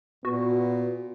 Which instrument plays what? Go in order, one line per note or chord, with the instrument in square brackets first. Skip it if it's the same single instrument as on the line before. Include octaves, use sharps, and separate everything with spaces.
[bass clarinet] A#2 [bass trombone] B3 [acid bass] F#4